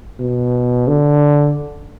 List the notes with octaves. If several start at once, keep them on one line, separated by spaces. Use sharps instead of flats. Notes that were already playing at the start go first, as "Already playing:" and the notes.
B2
D3